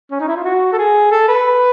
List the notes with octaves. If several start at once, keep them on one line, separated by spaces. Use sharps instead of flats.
C#4
D#4
E4
F4
F#4
A4
G#4
A4
B4